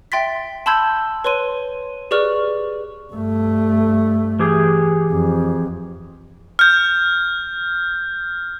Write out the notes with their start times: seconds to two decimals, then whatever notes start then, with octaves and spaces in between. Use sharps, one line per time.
0.12 E5 G5 C6 A6 B6
0.66 A5 B5 C6 E6 G6 G#6
1.24 B4 C#5 C6 D#7
2.11 G4 G#4 B4 D5 C#6 F6
3.13 G2 A3
4.39 E3 G4 G#4
5.12 F2
6.59 F6 G6